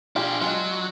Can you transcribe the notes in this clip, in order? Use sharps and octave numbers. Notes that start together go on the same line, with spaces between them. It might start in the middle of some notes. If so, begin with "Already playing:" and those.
D4 F4 G4 G#4
F#3 G#3 D4 F4